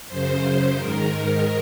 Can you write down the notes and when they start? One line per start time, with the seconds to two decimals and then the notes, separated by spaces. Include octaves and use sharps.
0.08 F#2 C#3 C5
0.42 C5
0.75 G#2 D#3 A#4